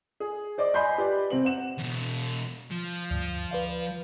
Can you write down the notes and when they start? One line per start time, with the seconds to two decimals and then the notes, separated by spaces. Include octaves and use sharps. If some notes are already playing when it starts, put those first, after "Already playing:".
0.20 G#4
0.58 C5 D5 D#5 D6
0.74 D#5 G#5 B5 C6 G6
0.98 G4 B4 D5
1.30 C3 C4 F#7
1.45 F#5 E7
1.79 E2 B2
2.71 F3
3.11 D2 G2
3.51 B4 D5 F5